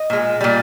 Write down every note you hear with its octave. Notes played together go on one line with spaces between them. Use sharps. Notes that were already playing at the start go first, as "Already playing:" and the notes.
Already playing: D#5
A#2 G#3
A#2 G3